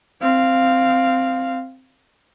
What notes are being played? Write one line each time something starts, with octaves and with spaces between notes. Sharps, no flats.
C4 F5